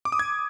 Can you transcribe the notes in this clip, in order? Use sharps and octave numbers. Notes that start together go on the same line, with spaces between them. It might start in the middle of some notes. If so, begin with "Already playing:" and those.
D6
D#6
G#6